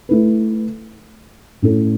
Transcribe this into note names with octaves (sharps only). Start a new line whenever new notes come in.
A3 E4 B4
A2 A3 C#4 E4 A4